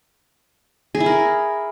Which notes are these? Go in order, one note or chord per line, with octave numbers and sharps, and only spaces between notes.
G#4
E4
A#4